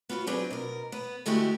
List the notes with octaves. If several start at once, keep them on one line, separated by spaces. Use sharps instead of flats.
B3 F4 F#4 B4
F#3 C4 D4 G#4 B4
B2 A#4
B3 B4
D3 G#3 A3 E4 F#4 G4